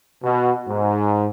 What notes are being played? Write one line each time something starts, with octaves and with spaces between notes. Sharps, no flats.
B2
G#2